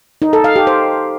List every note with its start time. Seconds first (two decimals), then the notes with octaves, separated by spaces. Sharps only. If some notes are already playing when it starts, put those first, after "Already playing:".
0.22 D#4
0.33 A4
0.44 F5
0.56 G4
0.67 C5